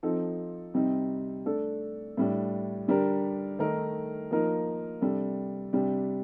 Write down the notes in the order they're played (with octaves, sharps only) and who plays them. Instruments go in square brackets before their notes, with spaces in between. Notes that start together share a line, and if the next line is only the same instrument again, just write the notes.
[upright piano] F3 C4 D#4 A4
C3 G3 C4 D#4
A3 D4 A4
A2 G3 D4
D3 G3 D4 G4 A#4
D#3 A3 D#4 A#4
F3 A#3 D#4 A#4
C3 G3 D4 A4
C3 G3 D4 G4